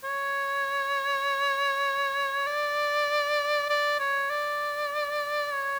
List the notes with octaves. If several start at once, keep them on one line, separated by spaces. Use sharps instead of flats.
C#5
D5
D5
C#5
D5
C#5